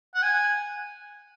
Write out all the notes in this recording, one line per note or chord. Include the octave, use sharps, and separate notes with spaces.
F#5
G#5